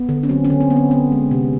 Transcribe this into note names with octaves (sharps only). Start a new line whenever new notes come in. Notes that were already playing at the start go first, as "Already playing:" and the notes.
Already playing: B3
D3
C#4
F#3 C4
C#4
D3
C4
B3
C4
B3
G#3
C3